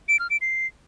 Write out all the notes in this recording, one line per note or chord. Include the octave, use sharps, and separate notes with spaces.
D7
F6
D7
C7